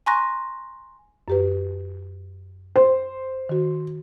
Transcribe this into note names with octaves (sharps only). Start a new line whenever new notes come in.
G#5 A#5 C6 C#6 F#6 A#6
F#2 G4 B4
C5
D#3 F#4